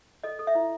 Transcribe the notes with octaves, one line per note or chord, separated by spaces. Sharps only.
A4 D#5
A4
E5
E4